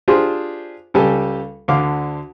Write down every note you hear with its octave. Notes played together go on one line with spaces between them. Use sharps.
D4 F4 G4 G#4 C5
C#2 G3 G4 A4 G#5
D2 D3 F5 D6